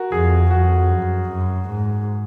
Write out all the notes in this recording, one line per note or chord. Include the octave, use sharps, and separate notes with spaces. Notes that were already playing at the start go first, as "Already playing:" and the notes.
Already playing: F#4 A#4
F2 G#4
F2 F#4
F#2
F#2
G#2